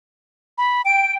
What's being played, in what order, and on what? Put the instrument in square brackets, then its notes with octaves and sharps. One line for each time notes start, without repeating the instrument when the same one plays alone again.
[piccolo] B5
[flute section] G5 [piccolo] D7